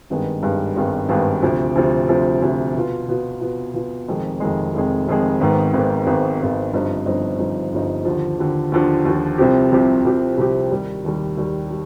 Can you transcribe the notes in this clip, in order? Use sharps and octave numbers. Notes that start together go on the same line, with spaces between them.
G#1 G2 D#3 G#3 B3
G#1 G2 D#3 G#3 B3
G#1 G2 D#3 G#3 B3
G#1 G2 D#3 G#3 B3
D2 C3 F3
D2 C3 F3
D2 C3 F3
D2 C3 F3
B2 B3 F4
B2 B3 F4
B2 B3 F4
B2 B3 F4
F1 F2 D#3 G#3
F1 F2 D#3 G#3
F1 F2 D#3 G#3
F1 F2 D#3 G#3
G#1 G#2 D#3 B3
G#1 G#2 D#3 B3
G#1 G#2 D#3 B3
G#1 G#2 D#3 B3
G1 G2 F3 C4 D#4
G1 G2 F3 C4 D#4
G1 G2 F3 C4 D#4
G1 G2 F3 C4 D#4
D#2 D3 F3
D#2 D3 F3
D#2 D3 F3
D#2 D3 F3
C2 C3 F3 C4 G4
C2 C3 F3 C4 G4
C2 C3 F3 C4 G4
C2 C3 F3 C4 G4
D#2 D#3 G3
D#2 D#3 G3
D#2 D#3 G3
G3